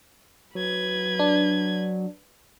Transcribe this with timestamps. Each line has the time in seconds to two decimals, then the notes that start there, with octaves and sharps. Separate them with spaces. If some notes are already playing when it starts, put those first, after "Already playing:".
0.55 F#3 B4 G#6
1.19 D4